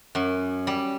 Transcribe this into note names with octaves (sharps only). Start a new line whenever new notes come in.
F#2
G3